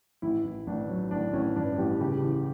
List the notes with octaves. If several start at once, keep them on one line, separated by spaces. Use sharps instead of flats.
A1 E4
A1
A1 D4
F#3
A1 D4
A1 C#4
G2 D4
A1 G4
C#3 G4
E3